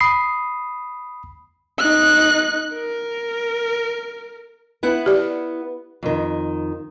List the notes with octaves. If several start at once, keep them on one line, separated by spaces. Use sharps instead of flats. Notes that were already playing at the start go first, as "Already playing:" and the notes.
B5 D#6 C7
D#4 F#6
A#4
B3 E4 F#5
G4 D5
F2 D#3